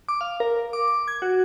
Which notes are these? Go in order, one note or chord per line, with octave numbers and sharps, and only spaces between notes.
D6
F5
A#4
D6
D6
G#6
F#4